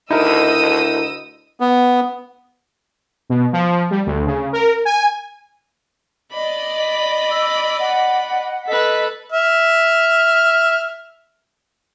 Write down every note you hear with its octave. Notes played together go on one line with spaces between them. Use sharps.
D2 D#4 E4 A#4 D#5 D#6 E6
B3
B2
F3
G3
D2
C#3
A#4
G#5
D5 D#5 B5
E6
F#5
A4 B4 D#5 B6
E5 F6